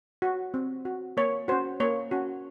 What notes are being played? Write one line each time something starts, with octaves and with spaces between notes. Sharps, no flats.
F#4
C4
F#4
A#3 C#5
C#4 F#4 C5
A#3 C#5
C#4 F#4